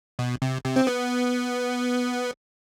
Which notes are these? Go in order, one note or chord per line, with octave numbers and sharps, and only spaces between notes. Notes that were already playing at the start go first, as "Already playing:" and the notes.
B2
C3
C3
C4
B3